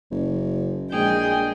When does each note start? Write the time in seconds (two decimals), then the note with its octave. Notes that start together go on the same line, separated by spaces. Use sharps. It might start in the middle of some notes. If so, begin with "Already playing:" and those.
0.11 F#1
0.92 A#1 G#3 G#4 G5